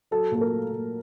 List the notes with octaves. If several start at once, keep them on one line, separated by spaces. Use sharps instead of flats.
F#3 A4
A#2 A4
A#4
A3
A#2